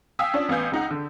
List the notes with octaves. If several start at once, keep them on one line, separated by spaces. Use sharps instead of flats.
F5 G5 G#5 D#6 E6 B6
C#4 D4 F4
A1 B3 F5 G#5 G6
C#2 D#4 F#5
D3